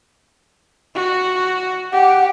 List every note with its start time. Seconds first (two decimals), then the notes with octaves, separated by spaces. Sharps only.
0.95 F#4
1.92 G4 F#5